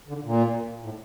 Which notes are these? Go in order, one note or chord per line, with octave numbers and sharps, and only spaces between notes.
D3
A#2
A2